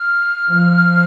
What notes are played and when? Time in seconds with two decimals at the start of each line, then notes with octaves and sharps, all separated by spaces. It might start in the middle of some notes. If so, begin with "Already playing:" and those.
Already playing: F6
0.50 F3